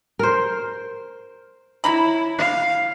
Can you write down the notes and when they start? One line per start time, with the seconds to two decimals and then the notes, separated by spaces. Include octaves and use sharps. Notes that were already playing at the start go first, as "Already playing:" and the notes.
0.19 A#4 C5
1.84 E4 C#5 A#5 B5
2.38 F5